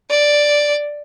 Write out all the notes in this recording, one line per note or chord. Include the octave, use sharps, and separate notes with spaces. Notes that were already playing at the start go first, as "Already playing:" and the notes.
D5